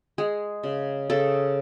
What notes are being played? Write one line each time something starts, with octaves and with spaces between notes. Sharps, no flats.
G#3 G#4
C#3
C#3 A4